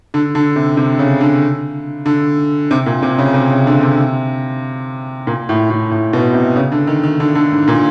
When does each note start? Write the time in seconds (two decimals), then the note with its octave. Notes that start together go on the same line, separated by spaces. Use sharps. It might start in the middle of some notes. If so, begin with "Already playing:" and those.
0.14 D3
0.35 D3
0.56 C3
0.77 C3
0.99 C#3
1.21 D3
2.06 D3
2.71 C3
2.86 A#2
3.02 C3
3.19 C#3
3.34 C3
3.50 C#3
3.67 D3
3.83 C3
5.27 A#2
5.49 A2
5.70 A2
5.91 A2
6.13 B2
6.34 C3
6.56 C#3
6.72 D3
6.87 D#3
7.03 D#3
7.20 D3
7.35 D3
7.51 G#2
7.68 A#2